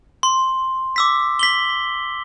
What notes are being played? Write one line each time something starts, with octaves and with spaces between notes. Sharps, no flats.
C6
D6 E6 B6
B6 F#7 G7